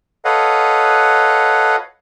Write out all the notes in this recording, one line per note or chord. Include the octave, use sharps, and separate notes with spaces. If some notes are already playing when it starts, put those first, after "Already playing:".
A4 B4 C#5 D#5 F5 F#5